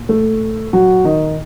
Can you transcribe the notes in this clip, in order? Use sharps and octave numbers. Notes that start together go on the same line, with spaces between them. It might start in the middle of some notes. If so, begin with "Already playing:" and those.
Already playing: A#2
A3 A4
F#3 F#4
D#3 D#4